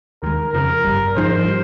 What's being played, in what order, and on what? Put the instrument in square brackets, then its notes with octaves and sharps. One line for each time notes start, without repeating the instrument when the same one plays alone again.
[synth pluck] D#2 D#3 G#3 [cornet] A#4
[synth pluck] F2 C#3 F3 [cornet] A#4
[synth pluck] G1 G2 G3
[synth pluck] G#2 F3 G#3 D#4 [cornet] C5
[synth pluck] G3